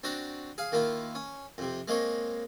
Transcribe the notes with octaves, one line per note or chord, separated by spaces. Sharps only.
C4 D4 F#4 A#5
G#4 F5
D#3 A#3 E4 F4
C#4
F2 C3
G#3 A#3 C4 C#5